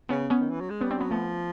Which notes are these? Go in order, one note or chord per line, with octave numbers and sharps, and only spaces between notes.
C#3 B3 C#4
B3 C#4
D#3
E3
F#3
G#3
B3 C#4
G3
C4 D4
F#3 B3 C#4
F3 A3 B3